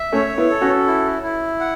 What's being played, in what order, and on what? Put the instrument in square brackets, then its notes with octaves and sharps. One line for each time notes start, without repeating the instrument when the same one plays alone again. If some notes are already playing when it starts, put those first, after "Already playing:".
Already playing: [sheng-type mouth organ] E5
[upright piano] A3 C#4 [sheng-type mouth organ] C#5
[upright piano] B3 E4
[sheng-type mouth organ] A4
[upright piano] C#4 F#4
[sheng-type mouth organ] E4
E4
F#5